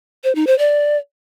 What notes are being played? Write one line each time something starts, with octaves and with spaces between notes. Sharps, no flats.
C5
D#4
C5
D5